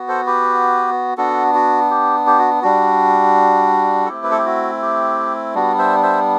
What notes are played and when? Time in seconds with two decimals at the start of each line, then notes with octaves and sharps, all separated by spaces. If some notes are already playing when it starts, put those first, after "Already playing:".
Already playing: B3 F#4
0.08 A4 C5
0.26 G4 B4
1.18 B3 D4 F#4 A4
1.55 F#4
1.90 G4
2.27 G4
2.38 F#4
2.62 G3 D4 F#4
4.05 A4
4.09 A3 C4 E4 G4
4.24 B4
4.31 A4
4.38 G4
4.45 F#4
4.82 G4
5.55 G3 B3 D4 F#4
5.78 C5 E5
6.03 C5 E5